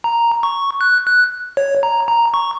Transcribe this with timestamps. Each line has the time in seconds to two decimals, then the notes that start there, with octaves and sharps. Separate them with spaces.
0.04 A#5
0.43 C#6
0.81 F#6
1.07 F#6
1.57 C#5
1.83 A#5
2.08 A#5
2.34 C#6